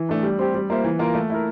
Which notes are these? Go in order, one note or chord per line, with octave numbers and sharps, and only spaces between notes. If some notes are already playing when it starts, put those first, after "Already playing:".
Already playing: E3
A3 D4
G3
C4 G4
G3
A#3 F4 C5 E5
E3
A#3 F4 A#4
A3
E4 A#4